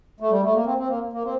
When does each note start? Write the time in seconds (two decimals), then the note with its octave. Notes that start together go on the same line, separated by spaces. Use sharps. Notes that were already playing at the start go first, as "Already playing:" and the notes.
0.20 A3
0.31 G3
0.43 A3
0.54 A#3
0.66 C4
0.78 C4
0.89 A#3
1.13 A#3
1.24 C4